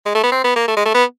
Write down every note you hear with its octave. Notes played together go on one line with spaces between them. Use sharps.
G#3
A3
B3
C4
B3
A#3
A3
G#3
A3
B3